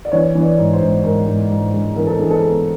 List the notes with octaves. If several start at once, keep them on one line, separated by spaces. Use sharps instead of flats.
D5
E3 C#5
E3
D5
G#2
C5
G#2
G#2 A#4
G#2
G#2
G#3
E3 A#4
A4
E3 G#4
A4
B3